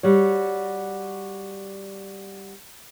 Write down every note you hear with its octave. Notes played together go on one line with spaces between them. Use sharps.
G3 F#4 C#5